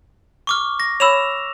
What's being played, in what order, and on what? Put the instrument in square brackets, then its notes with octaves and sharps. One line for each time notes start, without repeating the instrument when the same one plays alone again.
[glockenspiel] C#6 D6 F6
A#6
[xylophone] C#5 B5 [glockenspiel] E6 E7 F7